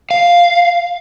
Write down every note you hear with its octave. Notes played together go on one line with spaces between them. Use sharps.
F5